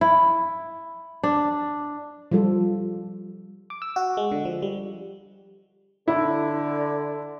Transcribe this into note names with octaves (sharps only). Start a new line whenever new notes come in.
E4
D4
F3 G3 F4 A4
D6
E6
F#4
G#3
D3
F3
G3
D3 E4